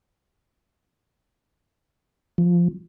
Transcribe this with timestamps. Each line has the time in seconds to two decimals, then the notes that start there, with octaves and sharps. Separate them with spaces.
2.38 F3